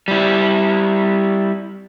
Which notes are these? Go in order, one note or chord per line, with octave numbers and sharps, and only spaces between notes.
G3 E4